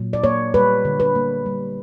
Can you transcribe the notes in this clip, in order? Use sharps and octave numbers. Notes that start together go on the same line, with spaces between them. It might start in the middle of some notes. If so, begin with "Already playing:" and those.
Already playing: A#2 F#3
D5
A#3 C#5
G3 B4
D3
B4
A#3
G3